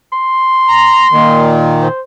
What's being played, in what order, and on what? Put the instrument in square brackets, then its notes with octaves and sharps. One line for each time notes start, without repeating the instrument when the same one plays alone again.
[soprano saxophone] C6
[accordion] A#5
A#2 D#3
[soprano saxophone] C5